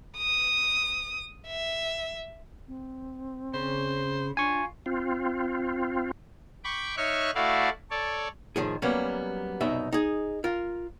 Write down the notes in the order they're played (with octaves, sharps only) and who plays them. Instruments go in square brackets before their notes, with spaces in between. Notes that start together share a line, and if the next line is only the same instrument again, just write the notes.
[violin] D#6
E5
[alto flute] C4
[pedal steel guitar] C#3 [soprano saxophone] C5
[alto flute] D4 [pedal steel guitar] F4 [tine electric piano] G#5 C#6
[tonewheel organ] C4 F4
[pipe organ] G5 B5 C#6 D6
D#4 C#5 E5 C#6 F6 F#6
A3 E4 F#4 D5 F5
A4 C#5 D5
[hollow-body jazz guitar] A2 D#3 F3 G#4
F#3 G3 A#3 B3 C#4
C2 F#2 B2 D#4 E5
D#4 G#4
F4 A#4